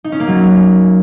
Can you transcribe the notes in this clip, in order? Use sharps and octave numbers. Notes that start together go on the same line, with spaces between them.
D#4
C#4
A#3
F#3